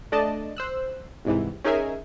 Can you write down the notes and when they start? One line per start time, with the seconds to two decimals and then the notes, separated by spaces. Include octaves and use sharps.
0.12 A3 D4 D5 D#5 A5
0.57 C5 E6 F#6
1.25 C2 G#2 C3 E3
1.64 C#4 D#4 G#4 A#4 E5 G#5